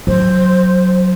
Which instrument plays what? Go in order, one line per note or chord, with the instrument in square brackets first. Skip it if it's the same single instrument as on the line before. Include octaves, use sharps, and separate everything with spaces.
[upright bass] F#3 [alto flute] C5